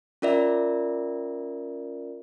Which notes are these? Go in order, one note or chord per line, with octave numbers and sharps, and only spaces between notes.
C#4 F4 A#4 D5 E5